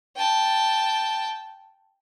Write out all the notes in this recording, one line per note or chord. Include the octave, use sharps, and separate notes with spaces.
G5 A5